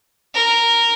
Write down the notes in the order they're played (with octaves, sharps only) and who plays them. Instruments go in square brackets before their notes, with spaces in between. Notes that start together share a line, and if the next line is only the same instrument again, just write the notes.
[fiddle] A#4